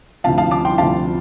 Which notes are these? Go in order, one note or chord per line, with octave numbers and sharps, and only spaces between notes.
D2 C3 F3 F5 A5
F5 A5
A5 D6
G5 C6
D2 C3 F3 F5 A5